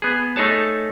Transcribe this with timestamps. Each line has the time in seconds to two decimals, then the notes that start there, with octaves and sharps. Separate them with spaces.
0.02 B3 G#4
0.36 A3 D#4 G#4 C#5 A5